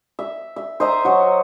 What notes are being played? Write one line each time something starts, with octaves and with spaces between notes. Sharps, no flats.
E5
E5
C5 D#5 E5 A#5
F#3 F#4